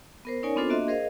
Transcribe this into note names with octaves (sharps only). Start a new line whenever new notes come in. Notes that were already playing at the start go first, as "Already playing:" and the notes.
B3 A#4 C5
C#4 D#4 A#4 C#5 D5 G#5
B3 C4 D4 F4 A4 C5
A#3 D4 F#4 D#5 E5 C6
G#4 A#4 C5 D#5 F5